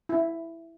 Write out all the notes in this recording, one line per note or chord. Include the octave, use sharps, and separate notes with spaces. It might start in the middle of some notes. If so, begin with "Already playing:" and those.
E4